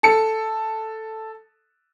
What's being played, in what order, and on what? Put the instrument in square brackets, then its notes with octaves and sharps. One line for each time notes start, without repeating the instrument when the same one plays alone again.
[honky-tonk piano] A4 C#7